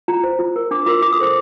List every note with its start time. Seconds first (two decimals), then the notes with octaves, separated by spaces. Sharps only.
0.08 F4 A#5
0.24 C5
0.39 F4
0.56 A#4
0.71 D4 D6
0.86 F4 A#4 D6
1.02 F4 D6
1.13 D#6
1.18 A4 C5 D6